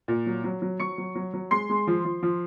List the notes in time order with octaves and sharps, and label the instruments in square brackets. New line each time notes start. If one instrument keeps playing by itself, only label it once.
[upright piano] A#2
F#3
F#3
F#3
F#3 C#6 C#7
F#3
F#3
F#3
G#3 C6 C7
G#3
F3
F3
F3